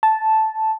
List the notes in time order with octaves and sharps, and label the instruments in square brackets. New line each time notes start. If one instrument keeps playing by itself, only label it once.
[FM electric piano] A5